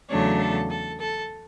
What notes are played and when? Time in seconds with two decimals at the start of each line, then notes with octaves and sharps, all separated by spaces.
0.10 E2 C#3 F#3 A3 D4 C#5
0.40 A4
0.71 A4
1.00 A4